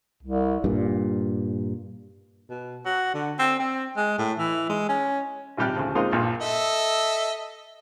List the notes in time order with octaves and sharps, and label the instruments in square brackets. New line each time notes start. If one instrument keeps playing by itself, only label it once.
[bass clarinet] C2
[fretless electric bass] G2 A#2
[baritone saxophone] B2
F#4
D3
C4
C4
G#3
A2
E3
G#3
C#4
[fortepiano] G#1 C3 G3 G4 F6 F#6
D2 C#3 F3
G#3 A#3 C4 D#4 F4
A#1 G2 A#2 F5
[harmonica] A4 D#5 E5